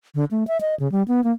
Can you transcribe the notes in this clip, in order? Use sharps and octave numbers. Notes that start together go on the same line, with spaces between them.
D3
A3
E5
D#5
C#3
G3
B3
A#3